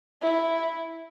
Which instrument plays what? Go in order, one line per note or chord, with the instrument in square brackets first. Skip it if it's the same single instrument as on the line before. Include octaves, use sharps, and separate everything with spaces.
[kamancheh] E4